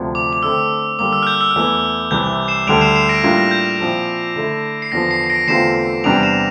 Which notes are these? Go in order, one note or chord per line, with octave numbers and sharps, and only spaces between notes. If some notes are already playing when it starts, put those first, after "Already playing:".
Already playing: D2 C3 F3
D6
D6
D3 A3 C4 E6
D3 G3 A#3 D6
E6
F6
G6
E6
F6
E2 E3 A3 E4 E6
C2 C3 E3 G6
C7 E7
D2 D3 G3 D7 F7
C7 E7
C7 E7
A#6 D7
A2 G3 A#3 D4 F4
A#6
G6
A#2 F3 C4 E4
D3 A3 E4
C7
E2 D3 F3 A#6
C7
C7
A#6 D7
E2 D3 A3 C4 F4 C7 E7
E2 C3 G3 D4 D7 F7
C7 E7